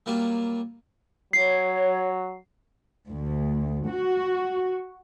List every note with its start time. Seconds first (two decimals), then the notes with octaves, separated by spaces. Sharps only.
0.06 F#3 G3 A#3 F4
1.33 F#3 C#5 C7
3.11 D2
3.90 F#4